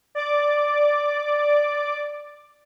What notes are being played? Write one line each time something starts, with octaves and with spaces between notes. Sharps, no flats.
D5 D6